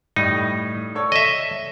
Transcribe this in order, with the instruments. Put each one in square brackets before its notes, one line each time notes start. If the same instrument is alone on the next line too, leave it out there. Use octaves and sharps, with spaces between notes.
[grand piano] A2 G3 [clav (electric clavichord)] D#4
[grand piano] A4 C#5 D5
[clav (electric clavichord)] D#5 E5